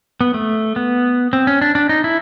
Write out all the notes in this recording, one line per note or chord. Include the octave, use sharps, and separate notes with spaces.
B3
A3
B3
C4
C#4
D4
D4
D#4
E4